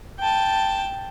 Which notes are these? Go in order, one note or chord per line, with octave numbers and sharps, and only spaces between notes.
G5 A5